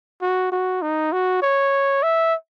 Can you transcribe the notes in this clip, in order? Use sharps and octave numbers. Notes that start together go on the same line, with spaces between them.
F#4
F#4
D#4
F#4
C#5
E5